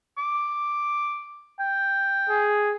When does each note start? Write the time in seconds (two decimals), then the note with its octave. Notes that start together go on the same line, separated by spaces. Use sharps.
0.18 D6
1.60 G5
2.30 G#4